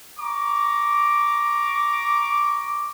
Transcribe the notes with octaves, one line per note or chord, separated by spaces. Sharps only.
A#5 C#6 D6